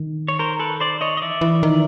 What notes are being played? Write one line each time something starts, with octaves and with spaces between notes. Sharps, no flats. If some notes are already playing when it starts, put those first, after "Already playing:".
Already playing: D#3
C#5
A#4 C5
A4 B4
C5 D5
C#5 D#5
D#5
E3 D5 E5
E3
D#3